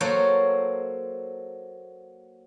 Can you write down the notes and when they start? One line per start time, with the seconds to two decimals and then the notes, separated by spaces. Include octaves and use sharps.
0.01 F#3 A#3 A4 C5 C#5